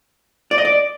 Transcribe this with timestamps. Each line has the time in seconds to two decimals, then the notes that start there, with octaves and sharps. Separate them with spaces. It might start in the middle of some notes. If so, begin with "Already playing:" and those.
0.51 D5
0.58 D#5
0.65 D5